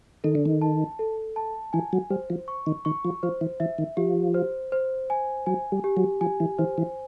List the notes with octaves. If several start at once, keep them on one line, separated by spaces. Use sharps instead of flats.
D#3 A4
D3
D#3
A5
A4
A5
E3 G#5
F#3
G3 C5
F3
C#6
D#3
D#3 C#6
F3
F3 C5
E3
E3 E5
D#3
F3 G4
C5
C5
G#5
F#3 G#5
G3
G4
F#3
F3 G#5
E3
E3 C5
E3